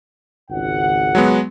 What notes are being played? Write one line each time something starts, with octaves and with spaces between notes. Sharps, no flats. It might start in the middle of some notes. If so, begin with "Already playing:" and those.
G#1 C#2 F#5
F#3 G#3 B3